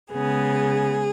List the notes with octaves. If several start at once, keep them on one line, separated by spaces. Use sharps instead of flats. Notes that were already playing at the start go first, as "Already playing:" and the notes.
C#3 G#3 B3 G#4